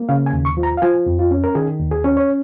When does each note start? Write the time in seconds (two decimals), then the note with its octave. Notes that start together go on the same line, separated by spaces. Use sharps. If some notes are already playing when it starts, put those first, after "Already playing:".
Already playing: A#3
0.09 C#3 F5
0.26 G#5
0.33 D#2
0.45 C#6
0.57 F3
0.63 A#5
0.77 F5
0.82 F3 G#5
1.06 F2
1.19 F4
1.31 C#4
1.44 A#4
1.55 D#3 G#4
1.80 D#2
1.91 G#4
2.04 C#4
2.17 C#5